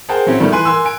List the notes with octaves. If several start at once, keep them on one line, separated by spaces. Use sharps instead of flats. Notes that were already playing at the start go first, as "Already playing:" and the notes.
G#4 A#4 C5 F#5 G5 A5
A2 F#3 C4 C#4 E4
D#3 F3 G3 A3 B3
E3 B4 G#5 C6 F#6 D#7
A#4 G#5 C6 E6
G#5 D7